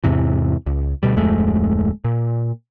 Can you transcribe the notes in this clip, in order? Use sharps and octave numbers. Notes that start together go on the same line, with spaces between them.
E2 G#2 C3 E3
C#2
D2 B2 G3
D1 F2 G#3 A3
A#2